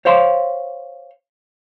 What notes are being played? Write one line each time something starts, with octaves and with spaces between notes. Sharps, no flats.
C5 C#5 F5 C6